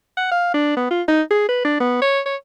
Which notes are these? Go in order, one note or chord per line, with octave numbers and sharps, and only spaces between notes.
F#5
F5
D4
B3
F4
D#4
G#4
B4
D4
B3
C#5
C#5